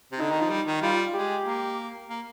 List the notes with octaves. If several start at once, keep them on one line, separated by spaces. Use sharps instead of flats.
C3
D3 D#4
D#3
F3
G3
D#3
G3 F4
G#3 G4
A#3
A#3